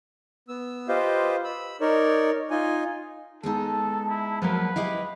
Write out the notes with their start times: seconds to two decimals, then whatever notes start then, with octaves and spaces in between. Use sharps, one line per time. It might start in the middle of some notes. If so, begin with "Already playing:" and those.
0.48 B3 E6
0.88 F4 G4 B4 C5 D#5 F5
1.44 B5 E6
1.81 D#4 A#4 C#5 D5
2.51 D#4 F4 D#5 G#5
3.43 G#3 B3 D#4 A4 A5
4.08 E4
4.42 F3 F#3 A#3 B4
4.76 E4 G4 D#5 F5